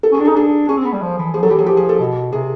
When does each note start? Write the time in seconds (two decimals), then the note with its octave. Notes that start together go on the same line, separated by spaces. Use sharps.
0.03 A4
0.12 C#4
0.14 G#4
0.20 D4
0.25 A4
0.28 D#4
0.35 D4 G#4
0.69 C#4 G#4
0.77 C4
0.86 B3
0.93 G3
1.02 F3
1.18 E3
1.34 F3 G#4
1.42 F#3 A4
1.50 E3 G4
1.59 F#3 G#4
1.66 F3 G4
1.77 G#4
1.89 A4
1.99 B2
2.32 C3 G#4